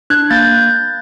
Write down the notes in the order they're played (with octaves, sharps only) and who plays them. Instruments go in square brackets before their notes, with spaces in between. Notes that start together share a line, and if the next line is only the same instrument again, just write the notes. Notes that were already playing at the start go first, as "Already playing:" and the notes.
[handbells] D4 F#6 G#6
A#3 G6 A6